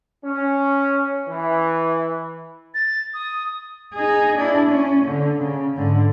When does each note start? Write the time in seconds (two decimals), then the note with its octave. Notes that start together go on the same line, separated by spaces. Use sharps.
0.23 C#4
1.28 E3
2.74 A6
3.14 D#6
3.94 D#4 G#4
4.37 D4 E4
4.70 C#4
5.05 D3
5.40 C#3
5.76 G#2 D3